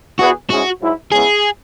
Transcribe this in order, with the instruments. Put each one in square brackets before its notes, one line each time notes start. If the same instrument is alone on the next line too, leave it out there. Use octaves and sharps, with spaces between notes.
[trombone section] E2 E3 B3 G#4 B4 [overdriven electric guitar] F#4
[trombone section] G#2 G#3 C#4 E4 G#4 [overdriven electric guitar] F#4
[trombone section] G#2 F#3 E4
[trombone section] C#3 G#3 B3 E4 [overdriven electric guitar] G#4